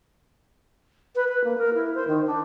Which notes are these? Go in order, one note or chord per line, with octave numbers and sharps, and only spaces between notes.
B4
B4
A#3
A#4
E4
C5
D#3
D4